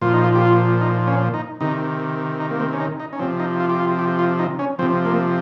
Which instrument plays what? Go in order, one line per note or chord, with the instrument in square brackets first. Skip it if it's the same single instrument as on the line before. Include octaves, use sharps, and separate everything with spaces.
[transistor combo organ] A#2 F3 F4
D#4
F4
G4
F4
D#4
C#4
D#4
C3 D#3 D#4
D#4
A#3
C4
C#4
D#4
D#4
C#4
C3 F3 C4
D#4
F4
G4
F4
G4
F4
D#4
C#4
F3 C4
C3
A#3